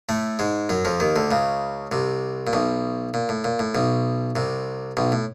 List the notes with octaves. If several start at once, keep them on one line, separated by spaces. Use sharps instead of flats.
A2 A3
G#2 G#3
F#2 F#3
F2 F3
D#2 D#3
D2 D3
C#2 C#3
C2 C3
A#2
B1 B2
A#2
A2
A#2
A2
B1 B2
C2 C3
B1 B2
A2